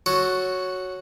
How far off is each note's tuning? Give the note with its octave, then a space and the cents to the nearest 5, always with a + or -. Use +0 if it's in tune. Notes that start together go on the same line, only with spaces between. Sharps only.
F#4 +0 A4 +0 C#5 +0